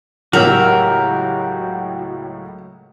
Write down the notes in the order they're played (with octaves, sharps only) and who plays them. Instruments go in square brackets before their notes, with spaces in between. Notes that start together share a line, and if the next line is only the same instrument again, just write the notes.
[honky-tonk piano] C#2 A2 F#3 [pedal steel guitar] F#4 G4 E6 [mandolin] A#4